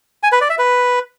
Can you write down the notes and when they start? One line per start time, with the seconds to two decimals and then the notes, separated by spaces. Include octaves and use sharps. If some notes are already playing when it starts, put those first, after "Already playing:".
0.23 G#5
0.32 B4
0.41 D5
0.50 E5
0.59 B4